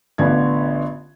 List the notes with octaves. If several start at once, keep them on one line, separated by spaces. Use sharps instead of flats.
A1 D3 B3 F4 G#6